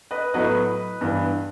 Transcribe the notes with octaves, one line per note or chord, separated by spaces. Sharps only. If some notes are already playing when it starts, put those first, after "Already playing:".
B4 D#5
A2 F#3 B3 B4 D#5
G2 E3 B3